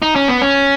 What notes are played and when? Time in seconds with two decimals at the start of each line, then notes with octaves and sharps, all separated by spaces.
0.02 D#4
0.16 C#4
0.28 B3
0.42 C#4